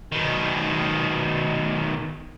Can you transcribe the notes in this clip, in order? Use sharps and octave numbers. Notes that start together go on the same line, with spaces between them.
B2 D#3